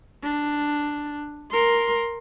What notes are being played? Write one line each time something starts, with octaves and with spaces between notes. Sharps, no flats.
D4
A#4 C6